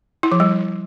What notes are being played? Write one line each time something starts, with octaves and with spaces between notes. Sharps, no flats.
E4
F3
G3